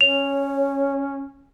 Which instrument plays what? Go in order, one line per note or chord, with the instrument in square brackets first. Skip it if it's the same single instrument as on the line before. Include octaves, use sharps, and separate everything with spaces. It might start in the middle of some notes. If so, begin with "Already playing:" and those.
[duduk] C#4 [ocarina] C#5 [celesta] F7